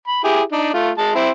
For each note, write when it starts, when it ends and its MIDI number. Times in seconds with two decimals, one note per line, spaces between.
0.08 0.22 83
0.24 0.41 64
0.24 0.41 67
0.24 0.41 68
0.52 0.71 62
0.52 0.71 63
0.74 0.90 57
0.74 0.90 65
0.98 1.11 56
0.98 1.11 81
1.15 1.29 60
1.15 1.29 64